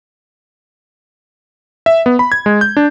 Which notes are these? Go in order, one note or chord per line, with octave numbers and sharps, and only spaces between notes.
E5
B3
B5
G#6
G#3
G6
D4